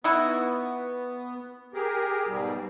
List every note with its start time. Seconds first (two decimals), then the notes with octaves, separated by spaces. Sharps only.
0.04 B3 D#4 E4 F#4
1.74 G4 G#4 A#4
2.28 G#2 B2 G3